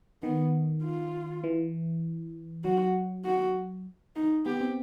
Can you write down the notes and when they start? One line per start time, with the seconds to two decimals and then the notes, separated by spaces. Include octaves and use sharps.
0.23 D#3 B3
0.83 F4
1.44 E3
2.64 F#3 F#4
3.25 F#4
4.16 D#4
4.46 B3 G4
4.61 C4